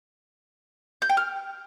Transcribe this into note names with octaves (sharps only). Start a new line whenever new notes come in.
G6
G5
F6